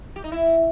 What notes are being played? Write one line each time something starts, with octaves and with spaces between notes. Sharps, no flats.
G4
D#4
E4